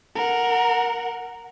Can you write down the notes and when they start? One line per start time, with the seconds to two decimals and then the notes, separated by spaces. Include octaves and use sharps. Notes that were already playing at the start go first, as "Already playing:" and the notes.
0.16 A#4 F#5